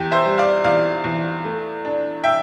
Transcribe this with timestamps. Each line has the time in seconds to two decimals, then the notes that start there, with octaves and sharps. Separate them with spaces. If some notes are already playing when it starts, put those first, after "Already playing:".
Already playing: E2 G4
0.11 C5 E5
0.26 G3
0.38 D5 F5
0.64 E2 D5 F5
1.04 E2
1.44 A3
1.85 D4
2.24 E5 G5